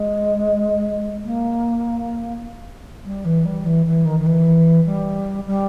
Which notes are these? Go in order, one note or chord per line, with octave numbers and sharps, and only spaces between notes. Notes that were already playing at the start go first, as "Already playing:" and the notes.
Already playing: G#3
A#3
G3
E3
G3
E3
E3
D#3
D#3
E3
G3
G3